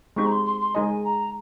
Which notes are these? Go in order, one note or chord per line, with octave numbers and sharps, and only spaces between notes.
G#3 C4 D#4 G4 C#6
A#5
C6
C6
C6
G#3 D#4 G#4 D#5 G#5
A#5